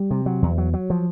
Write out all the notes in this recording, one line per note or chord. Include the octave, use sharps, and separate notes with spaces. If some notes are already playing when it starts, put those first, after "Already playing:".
Already playing: G3
C3
F#3
E2
F#3
F#3
F3